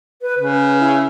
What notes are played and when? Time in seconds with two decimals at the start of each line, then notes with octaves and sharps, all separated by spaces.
0.22 B4
0.39 C#3 B4
0.80 E4